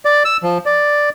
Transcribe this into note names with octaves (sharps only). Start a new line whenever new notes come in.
D5
E6
F3
D5